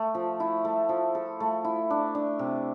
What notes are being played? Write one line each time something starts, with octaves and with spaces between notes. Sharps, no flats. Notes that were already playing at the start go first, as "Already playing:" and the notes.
Already playing: A3
F3
E4
A3
F3
A4
A3
E4
D4
D4
C3